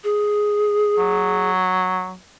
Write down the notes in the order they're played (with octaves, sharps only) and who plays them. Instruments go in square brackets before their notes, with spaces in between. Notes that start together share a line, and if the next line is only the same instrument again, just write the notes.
[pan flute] G#4
[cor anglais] F#3